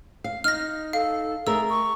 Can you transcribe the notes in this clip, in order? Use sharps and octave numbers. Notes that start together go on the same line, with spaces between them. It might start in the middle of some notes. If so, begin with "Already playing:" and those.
F5
D#4 F6 A#6
A4 F5
A3 G#4 A#4 E6
C#6